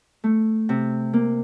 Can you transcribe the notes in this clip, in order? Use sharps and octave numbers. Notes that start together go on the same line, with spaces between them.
A3
C3
A#3